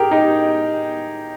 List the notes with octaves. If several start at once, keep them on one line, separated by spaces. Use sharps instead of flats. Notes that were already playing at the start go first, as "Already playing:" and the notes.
Already playing: G4 G#4 A#4
D#4 G4